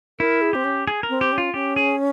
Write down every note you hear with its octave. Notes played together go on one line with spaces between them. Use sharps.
E4 A#4
G#4
C4 G4
C#4
G#4
A#4
C4
G4
C#4
F4
C#4 G4
G#4